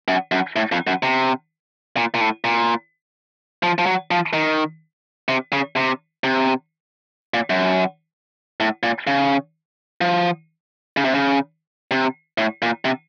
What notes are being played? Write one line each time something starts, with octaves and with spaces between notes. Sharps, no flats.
F#2
F#2
A2
F2
F#2
C3
A#2
A#2
A2
A#2
F3
F3
F#3
F3
D#3
C3
C#3
C3
C3
A#2
F#2
A2
A#2
C#3
F3
C#3
C3
C#3
C3
A2
A#2
C3